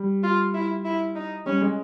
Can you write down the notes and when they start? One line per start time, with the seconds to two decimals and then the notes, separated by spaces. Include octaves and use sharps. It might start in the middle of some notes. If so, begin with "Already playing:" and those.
Already playing: G3
0.24 F4
0.55 E4
0.85 E4
1.16 D#4
1.46 G3 C#4
1.61 G#3